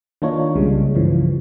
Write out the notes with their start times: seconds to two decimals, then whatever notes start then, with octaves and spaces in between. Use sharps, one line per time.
0.22 D#3 A#3 D4 D#4 F4 C#5
0.55 C2 C#3 G3 G#3
0.95 G2 C#3 E3 F3